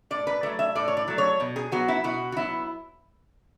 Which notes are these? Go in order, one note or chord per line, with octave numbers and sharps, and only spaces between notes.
A2 D5
B4
F#3 A3 D5
E5
A2 D5
C#5
D5
F#3 A3
C#5
B2
G#4
F#3 B3 F#4
E4
B2 F#4
F#4
F#3 B3 E4